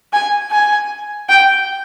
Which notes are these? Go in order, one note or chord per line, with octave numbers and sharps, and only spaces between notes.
G#5
G#5
G5